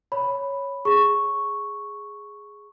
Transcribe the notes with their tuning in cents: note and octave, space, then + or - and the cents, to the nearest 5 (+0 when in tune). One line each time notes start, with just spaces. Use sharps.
C#5 +0 B5 +0
G#4 +0 A#5 +0 C#6 +0